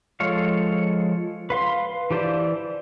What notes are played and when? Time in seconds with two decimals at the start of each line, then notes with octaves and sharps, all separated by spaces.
0.20 F3 G#3 A4 C#5 F5
1.50 B4 F5 C6
2.11 E3 G4 C5 D5 A5